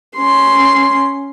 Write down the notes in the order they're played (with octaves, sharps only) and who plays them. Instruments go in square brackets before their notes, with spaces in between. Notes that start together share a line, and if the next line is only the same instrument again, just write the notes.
[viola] C#4 C6